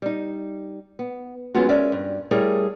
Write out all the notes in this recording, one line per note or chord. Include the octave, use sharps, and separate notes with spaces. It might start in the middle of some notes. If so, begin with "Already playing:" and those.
G3 D#4
B3
F#3 G#3 B3 C#4 F4 F#4
G#3 C#4 A#4 D5 E5
G2
G3 A3 E4 G#4 A#4 C#5